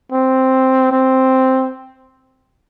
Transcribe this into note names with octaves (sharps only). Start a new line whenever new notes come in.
C4
C4